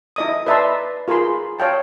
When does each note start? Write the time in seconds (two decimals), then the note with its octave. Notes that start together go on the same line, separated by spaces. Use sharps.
0.16 E4 D#5 D#6
0.46 B4 D5 E5 A5 A#5 C6
1.08 F4 G#4 A#4 B5 C6
1.59 C#5 F5 G5 A5